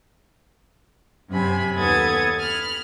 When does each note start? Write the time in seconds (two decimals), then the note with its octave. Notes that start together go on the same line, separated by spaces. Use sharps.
1.30 F#2 C3 G#5 B5
1.75 D#2 B3 A4 D#6 G#6 A6
2.40 B5 F6